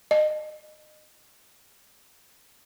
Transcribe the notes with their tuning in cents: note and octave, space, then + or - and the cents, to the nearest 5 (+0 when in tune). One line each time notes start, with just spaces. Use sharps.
D#5 -30